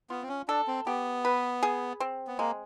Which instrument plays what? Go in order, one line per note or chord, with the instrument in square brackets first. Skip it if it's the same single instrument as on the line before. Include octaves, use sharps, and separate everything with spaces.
[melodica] B3 [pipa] F4
[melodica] C4
C#4
[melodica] D4 [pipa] A4
[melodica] C4
[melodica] B3 [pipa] G4
[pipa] B4
G#4
C4
[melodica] B3
[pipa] G#3 [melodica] A#3